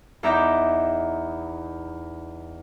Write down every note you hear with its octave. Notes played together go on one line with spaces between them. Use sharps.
E2 D#4 E5 A#5 D6 G6